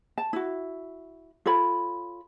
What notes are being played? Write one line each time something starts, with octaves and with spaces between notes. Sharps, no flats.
A5
E4 F#4
F4 A4 C#5 B5